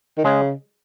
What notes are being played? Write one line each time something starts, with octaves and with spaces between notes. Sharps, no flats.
D#3
C#3 G#3